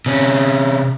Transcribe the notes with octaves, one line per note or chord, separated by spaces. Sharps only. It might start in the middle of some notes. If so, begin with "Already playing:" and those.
C3 C#4